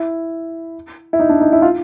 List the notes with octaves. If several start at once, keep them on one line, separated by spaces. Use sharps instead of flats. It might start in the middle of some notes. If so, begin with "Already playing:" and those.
Already playing: E4
E4
D#4
D4
D#4
E4
F4